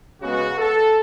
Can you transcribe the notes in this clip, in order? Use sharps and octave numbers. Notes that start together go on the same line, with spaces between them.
C#3 G#3 B3 F#4
A4